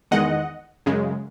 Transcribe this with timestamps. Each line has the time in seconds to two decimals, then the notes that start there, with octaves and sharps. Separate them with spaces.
0.11 E2 D#3 G#3 D#5 F#5
0.86 F#2 C#3 G#3